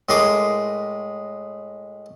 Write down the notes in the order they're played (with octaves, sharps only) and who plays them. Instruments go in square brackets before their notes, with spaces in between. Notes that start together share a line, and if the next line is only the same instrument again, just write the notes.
[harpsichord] A2 G#3 A#4 C6 D6 D#6